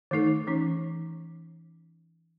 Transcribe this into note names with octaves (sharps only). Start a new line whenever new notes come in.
D#3 A3 D#4 A4
E3 C#4 D#4